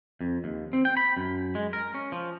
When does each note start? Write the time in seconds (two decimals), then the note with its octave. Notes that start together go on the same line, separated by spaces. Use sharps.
0.21 F2
0.44 D#2
0.73 C4
0.85 G5
0.97 B5
1.17 F#2
1.55 G#3
1.73 A#4
1.94 C#4
2.12 F3